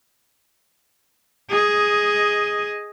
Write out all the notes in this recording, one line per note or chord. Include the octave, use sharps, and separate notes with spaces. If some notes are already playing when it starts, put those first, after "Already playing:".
G#4 D#5